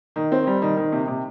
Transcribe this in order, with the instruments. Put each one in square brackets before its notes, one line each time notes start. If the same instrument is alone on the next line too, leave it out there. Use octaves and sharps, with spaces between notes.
[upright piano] D#3
C4
G3
D#3
D#3
C3
C3